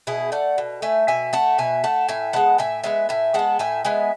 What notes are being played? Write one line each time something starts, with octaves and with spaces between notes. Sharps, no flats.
B2 E4 G#4
A3 D5 F#5
B2
A3 E5 G#5
B2 E5 G#5
A3 F#5 A5
B2 E5 G#5
A3 F#5 A5
A2 E5 G#5
G#3 B3 F#5 A5
A2 E5 G#5
G#3 B3 E5 G#5
A2 E5 G#5
G#3 B3 F#5 A5
A2 E5 G#5
G#3 B3 E5 G#5